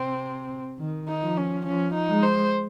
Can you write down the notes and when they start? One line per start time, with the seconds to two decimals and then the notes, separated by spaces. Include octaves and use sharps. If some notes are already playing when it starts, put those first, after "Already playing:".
Already playing: C3 C4
0.79 D#3
1.08 D#4
1.22 F3
1.37 C#4
1.66 F3 C#4
1.94 D#4
2.09 G#3
2.23 C5